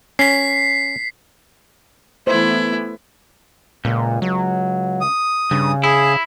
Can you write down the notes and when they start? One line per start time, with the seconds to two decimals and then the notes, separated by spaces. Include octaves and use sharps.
0.19 C#4 B6 C7
2.27 E3 A3 B3 E4 C5
3.85 C#2 A#2
4.22 F#3
5.01 D#6
5.51 G2 C#3
5.84 E4 G#4